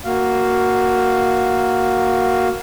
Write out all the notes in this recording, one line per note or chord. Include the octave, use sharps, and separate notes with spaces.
A#3 F#4 F5